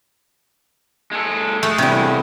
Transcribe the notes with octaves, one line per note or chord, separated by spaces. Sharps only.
G#3 A4
G#3 A3 G#4
E2 C3 G3 G#3